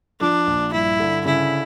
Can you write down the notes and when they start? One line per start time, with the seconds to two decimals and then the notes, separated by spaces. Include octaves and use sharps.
0.20 F3 D4
0.47 A#1
0.73 G2 E4
0.99 D3
1.25 C#3 E4